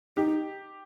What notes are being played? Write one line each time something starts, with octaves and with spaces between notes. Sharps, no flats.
D#4 G4